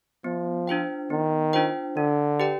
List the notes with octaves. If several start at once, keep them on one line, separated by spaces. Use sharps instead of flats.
F3 B3
D4 F4 C5 G5
D#3 B3
D4 F4 C5 G5
D3 D4
G4 B4 D5 G5